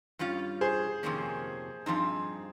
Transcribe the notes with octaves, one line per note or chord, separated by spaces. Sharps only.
G2 G3 C#4 F4
G#4 C5
F2 C3 D#3 A#3 C#4
G2 F3 C4 D#4